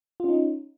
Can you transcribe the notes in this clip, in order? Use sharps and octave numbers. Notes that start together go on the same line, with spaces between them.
C#4 D#4 F4